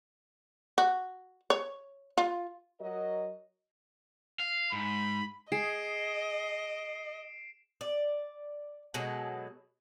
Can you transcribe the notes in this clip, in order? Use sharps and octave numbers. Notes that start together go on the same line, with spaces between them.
F#4
C#5
F4
F#3 F#4 A#4 D#5
F5
G#2 B5
G#4 D#5 C7 D7 E7
D5
B2 F#3 G#3 A4